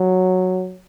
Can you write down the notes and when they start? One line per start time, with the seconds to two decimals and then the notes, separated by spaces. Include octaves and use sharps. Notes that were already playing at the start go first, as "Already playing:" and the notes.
Already playing: F#3